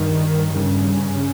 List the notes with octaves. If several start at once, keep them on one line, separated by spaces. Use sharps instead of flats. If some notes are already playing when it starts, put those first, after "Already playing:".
Already playing: G2 D#3
G2 C#3